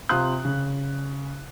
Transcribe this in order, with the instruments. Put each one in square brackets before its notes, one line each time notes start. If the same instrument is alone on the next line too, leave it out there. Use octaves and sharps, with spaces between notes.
[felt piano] C3 F4 F5 C6 D#6 F#6
C#3